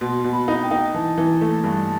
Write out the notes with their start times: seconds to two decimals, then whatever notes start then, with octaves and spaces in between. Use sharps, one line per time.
0.01 B2 C6
0.24 B2
0.33 B5
0.48 D#4
0.63 G5
0.71 D#4
0.94 E3 A5
1.18 E3
1.41 A3
1.64 G2